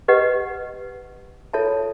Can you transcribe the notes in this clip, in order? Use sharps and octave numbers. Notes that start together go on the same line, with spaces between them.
G4 B4 D#5 F#5
F4 A4 C#5 E5 A5